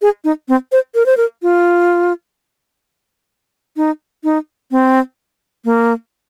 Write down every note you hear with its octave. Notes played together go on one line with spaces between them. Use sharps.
G#4
D#4
C4
C5
A#4
C5
A#4
F4
D#4
D#4
C4
A#3